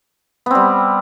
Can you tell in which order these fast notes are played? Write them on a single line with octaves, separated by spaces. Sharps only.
B3 C4 G3